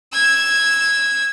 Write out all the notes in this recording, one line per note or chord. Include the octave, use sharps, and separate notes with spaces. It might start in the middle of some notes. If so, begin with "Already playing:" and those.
E6 G#6